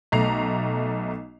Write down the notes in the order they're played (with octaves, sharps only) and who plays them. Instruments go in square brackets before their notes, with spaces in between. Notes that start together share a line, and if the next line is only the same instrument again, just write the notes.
[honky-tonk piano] B1 A3 A#5 C7 F7